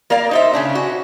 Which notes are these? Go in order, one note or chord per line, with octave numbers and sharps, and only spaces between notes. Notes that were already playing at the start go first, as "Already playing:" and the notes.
A#3 A#4 D5 F5
D#4 C5 E5
C#3 C#4 D4
F#4